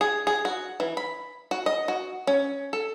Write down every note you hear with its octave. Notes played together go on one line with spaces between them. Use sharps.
G#4
G#4
F#4
E3
B5
F#4
D#5
F#4
C#4
A4